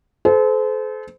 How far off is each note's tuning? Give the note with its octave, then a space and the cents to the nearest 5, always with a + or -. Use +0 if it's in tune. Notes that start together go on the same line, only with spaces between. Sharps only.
A4 -40 C5 -30